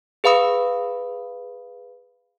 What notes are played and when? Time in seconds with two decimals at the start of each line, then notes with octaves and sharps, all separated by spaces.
0.24 G#4 B4 F5 B5 D#6